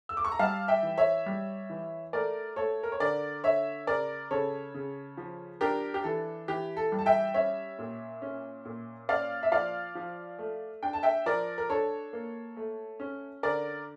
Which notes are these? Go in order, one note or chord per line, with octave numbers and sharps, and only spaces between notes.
E6
D6
C#6
A#5
G3 F5 A5
E5 G5
E3
C#5 E5
G3
E3
A3 A#4 D5
A3 A4 C#5
A#4
C#5
D3 A#4 D5
D3 C#5 E5
C#3 A#4 D5
C#3 A4 C#5
C#3
F3
D4 G4 A#4
G4
E3 A4
E3 G4
A4
G3
A5
E5 G5
C#4 C#5 E5
A#2
C#4
A#2
C#4 D5 F5
E5
F3 D5 F5
F3
A3
D4 G5
A5
E5 G5
F3 A#4 D5
A#4
D4 A4 C#5
A#3
A3
C#4
D3 A#4 D5